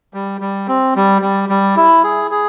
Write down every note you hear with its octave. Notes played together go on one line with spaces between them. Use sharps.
G3
G3
C4
G3
G3
G3
E4
G#4
G#4